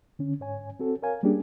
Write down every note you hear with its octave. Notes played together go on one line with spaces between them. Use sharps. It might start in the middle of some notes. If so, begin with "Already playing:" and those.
D3 C#4
G#2 C#5 G#5
C4 F#4 A4
A#4 C#5 F5 G#5
G3 A#3 C#4 D4 G4 G#4